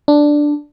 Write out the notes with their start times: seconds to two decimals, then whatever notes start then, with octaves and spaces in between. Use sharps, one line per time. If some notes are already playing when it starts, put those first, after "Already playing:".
0.08 D4